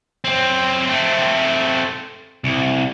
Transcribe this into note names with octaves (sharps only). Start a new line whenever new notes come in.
F#2 C4
A3 C4
C2